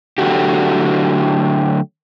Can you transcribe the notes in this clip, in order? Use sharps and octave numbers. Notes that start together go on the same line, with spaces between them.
D3 F#3 A3 F#4 G4